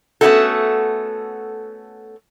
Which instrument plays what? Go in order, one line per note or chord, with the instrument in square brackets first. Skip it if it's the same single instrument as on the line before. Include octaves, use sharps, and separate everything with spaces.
[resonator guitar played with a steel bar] A3 B3 C#4 D#4 F#4 A4